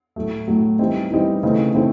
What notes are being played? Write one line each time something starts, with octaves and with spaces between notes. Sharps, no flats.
A2 F#3 A3
A2 F#3 A3
E3 G3 C4 D#4
E3 G3 C4 D#4
C#3 E3 A3 C4 D#4
C#3 E3 A3 C4 D#4